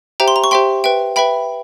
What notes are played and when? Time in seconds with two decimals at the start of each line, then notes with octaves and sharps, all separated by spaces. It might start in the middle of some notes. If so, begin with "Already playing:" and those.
0.20 G4 C5 E5 G5 A#5
0.28 C6
0.36 A#5
0.44 C#6
0.51 G4 C5 E5 G5 C6
0.84 B4 E5 G5
1.16 B4 E5 G5 B5